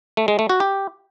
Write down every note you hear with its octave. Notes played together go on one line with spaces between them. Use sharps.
A3
G#3
A3
F#4
G4